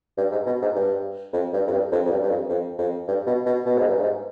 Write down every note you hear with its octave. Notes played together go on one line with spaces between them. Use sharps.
G2
G#2
B2
G#2
G2
F2
G2
F2
G2
F2
F2
G2
G2
F2
F2
F2
G2
B2
B2
B2
G#2
G2
G#2